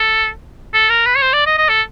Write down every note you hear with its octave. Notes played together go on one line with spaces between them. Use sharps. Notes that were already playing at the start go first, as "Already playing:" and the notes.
Already playing: A4
A4
A#4
B4
C#5
C5
D5
D#5
D#5
A4